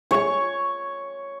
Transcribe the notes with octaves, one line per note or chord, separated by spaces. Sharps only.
C#5 C#6